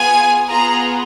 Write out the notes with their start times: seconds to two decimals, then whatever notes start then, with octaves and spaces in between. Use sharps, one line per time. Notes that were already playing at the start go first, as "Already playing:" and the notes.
Already playing: B3 F4 G#4 G#5
0.47 B3 F4 G#4 A#5